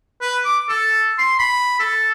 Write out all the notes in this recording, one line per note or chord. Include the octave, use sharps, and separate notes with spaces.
B4
D6
A4
C6
B5
A4